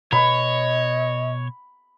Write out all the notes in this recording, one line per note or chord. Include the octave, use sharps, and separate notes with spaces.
B2 B4 C#5 D#5 B5